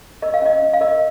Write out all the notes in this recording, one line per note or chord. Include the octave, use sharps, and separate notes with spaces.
A#4 D#5
F5
C#4 D#5
C#4
F5
A#4 D#5